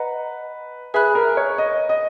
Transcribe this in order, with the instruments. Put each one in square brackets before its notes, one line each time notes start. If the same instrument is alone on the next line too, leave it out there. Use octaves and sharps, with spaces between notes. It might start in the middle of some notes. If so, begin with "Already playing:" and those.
Already playing: [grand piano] B4 [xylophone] D#5 F#5 A#5
[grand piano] G#4 [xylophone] B4 E5 B5 F#6
[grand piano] A#4
C#5
D#5
D#5